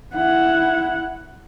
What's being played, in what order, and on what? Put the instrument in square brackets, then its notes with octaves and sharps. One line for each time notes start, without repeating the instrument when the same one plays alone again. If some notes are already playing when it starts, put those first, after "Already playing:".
[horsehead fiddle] E4 F#5